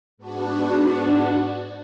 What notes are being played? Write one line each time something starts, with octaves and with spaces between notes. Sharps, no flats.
G#2 B3 D4 F#4